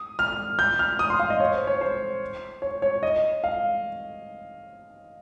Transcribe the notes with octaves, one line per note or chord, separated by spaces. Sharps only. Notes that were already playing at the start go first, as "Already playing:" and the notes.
Already playing: D#6
F6
G6
F6
D#6
C6
F5
D#5
C#5
C5
C#5
C5
C#5
C#5
D#5
F5